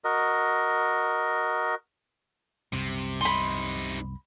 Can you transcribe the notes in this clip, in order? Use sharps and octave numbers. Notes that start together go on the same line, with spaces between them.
F#4 A#4 D#5
C2 F#2 C3
C3 D#4 B5 C6